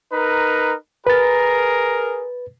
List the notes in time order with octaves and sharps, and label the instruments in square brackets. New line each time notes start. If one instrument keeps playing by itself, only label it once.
[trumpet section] D#4 A#4 B4
[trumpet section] G#4 A#4 [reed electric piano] B4 A6